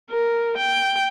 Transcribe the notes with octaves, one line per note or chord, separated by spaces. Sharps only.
A#4
G5